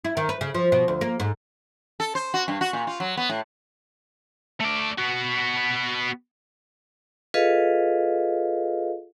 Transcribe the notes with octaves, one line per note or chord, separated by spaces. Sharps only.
E4
D#3
B4
C#3
F3
B2
D2
A#3
G#2
A4
C5
F#4
G2
F#4
A#2
F4
F#3
B3
A2
A3 D5
B3 F#4
F4 G#4 A4 B4 D#5 F5